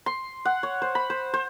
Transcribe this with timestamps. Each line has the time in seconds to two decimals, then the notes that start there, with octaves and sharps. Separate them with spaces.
0.06 C6
0.45 F#5
0.63 C#5
0.82 C5
0.95 B5
1.10 C5
1.34 C5